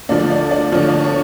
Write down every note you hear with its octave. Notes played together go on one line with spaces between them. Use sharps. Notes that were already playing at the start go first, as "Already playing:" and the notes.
D2 D3 F3 D5
D5
D5
D2 D3 F3 C#5
D5
C#5